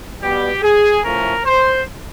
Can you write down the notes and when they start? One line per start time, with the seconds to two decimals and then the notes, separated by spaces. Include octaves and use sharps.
0.21 B2 G3 B3 G4
0.63 G#4
1.03 A2 F3 A3 C#4 A#4
1.45 C5